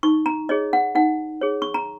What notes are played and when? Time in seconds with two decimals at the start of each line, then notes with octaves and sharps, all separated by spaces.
0.03 D#4 C#6
0.26 A#5
0.49 G#4 C#5 D#5
0.73 F#5
0.95 D#4 F#5
1.41 G#4 C#5
1.62 C#6
1.74 A#5